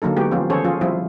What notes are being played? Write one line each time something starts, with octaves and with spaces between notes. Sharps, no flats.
D3 F#3 A#3 D#4 A4
G#3 B3 F#4 G4
F3 B3 C#4 F4
D#3 C#4 G#4 A4 C5 C#5
F3 C#4 F4 G#4
F3 G3 C4 E4 F4